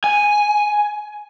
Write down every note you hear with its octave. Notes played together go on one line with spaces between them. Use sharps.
G#5